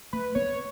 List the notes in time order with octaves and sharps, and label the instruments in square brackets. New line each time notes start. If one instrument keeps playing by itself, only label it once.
[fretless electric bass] A3 [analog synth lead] B4
[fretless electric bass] B3 [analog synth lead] C#5